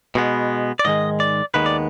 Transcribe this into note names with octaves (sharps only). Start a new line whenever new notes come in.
B2 G#3 B3
D5
G#2 D#3 G#3 D#5
D5
D#2 D#3 G#3 B3 B4
D5